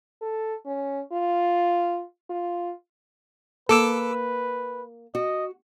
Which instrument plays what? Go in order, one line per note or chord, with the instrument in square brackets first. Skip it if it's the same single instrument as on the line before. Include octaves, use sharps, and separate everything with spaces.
[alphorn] A4
C#4
F4
F4
[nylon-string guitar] A#3 [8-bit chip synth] A4 D6 E6 [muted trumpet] B4
[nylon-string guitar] F#4 [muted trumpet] D#5